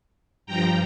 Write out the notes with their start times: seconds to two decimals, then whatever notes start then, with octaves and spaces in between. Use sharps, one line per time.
0.46 G2 F3 G5 A#5